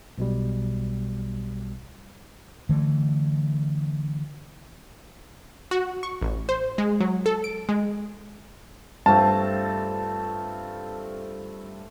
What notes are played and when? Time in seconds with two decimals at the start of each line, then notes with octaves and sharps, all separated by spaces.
0.18 B1 B2 G3
2.69 D3 E3 A3
5.71 F#4
6.03 C#6
6.22 A1
6.49 C5
6.78 G#3
7.00 F#3
7.26 A4
7.44 D7
7.69 G#3
9.06 G2 A3 C4 F4 A5